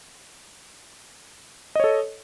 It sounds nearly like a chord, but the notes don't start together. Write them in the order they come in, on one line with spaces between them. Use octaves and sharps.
D#5 C#5 A4